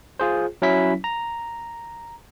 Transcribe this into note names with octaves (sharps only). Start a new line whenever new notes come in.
F4 G#4 C5
F#3 C#4 E4 B6
A#5